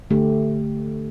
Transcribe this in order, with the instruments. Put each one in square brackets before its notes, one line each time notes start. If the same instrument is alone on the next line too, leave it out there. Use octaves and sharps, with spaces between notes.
[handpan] D3 A3 G4